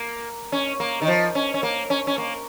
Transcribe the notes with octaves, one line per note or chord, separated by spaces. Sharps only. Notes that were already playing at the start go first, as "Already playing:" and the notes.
Already playing: A#3
C#4
A#3
D#3
F3
C#4
C#4
A#3
C#4
C#4
A#3